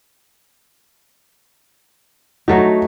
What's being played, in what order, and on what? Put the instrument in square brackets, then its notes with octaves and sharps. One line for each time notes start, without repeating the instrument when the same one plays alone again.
[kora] F#3 A3 D#4 [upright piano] F#4